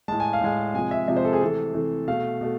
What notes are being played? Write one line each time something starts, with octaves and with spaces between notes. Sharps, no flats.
A2 G#3 A5
G#5
F5
A2 G#3 G#5
C3 F3 G#3 G#5
E5
C3 F3 G#3 E5
C5
A4
G#4
C3 E3 A3 A4
C3 E3 A3
B2 A3 F5
B2 A3